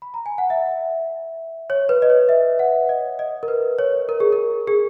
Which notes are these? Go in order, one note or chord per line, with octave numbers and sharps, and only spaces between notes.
B5
A#5
G#5
F#5
E5
C#5
B4
D#5
C#5
E5
F#5
D#5
D#5
A#4
B4
C#5
A#4
G#4
A#4
G#4